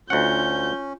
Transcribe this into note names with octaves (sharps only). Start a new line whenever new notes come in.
D2 C#4 F4 F#5 G6